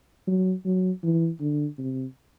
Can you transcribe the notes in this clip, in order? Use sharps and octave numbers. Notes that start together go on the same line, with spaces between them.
F#3
F#3
E3
D3
C3